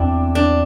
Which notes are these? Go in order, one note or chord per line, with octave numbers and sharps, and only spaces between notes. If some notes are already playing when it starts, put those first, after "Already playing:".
Already playing: E2 C4 D4 E4
D4